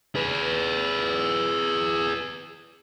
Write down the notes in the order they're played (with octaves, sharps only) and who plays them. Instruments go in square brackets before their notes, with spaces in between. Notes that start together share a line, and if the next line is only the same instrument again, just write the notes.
[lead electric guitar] G#4 B4